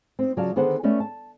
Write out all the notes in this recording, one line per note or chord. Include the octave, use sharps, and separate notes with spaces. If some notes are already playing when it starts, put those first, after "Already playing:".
C4 D#4
C#3 F#3 F4 D5 F5 A5
D3 D#3 B3 G#4 C5 F#5
A3 B3 C#4 D5 D#5
A5